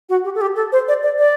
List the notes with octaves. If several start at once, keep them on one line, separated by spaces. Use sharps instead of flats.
F#4
G4
A4
G4
A4
C5
D5
D5
D5